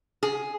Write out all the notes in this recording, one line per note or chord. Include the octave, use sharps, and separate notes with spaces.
G#4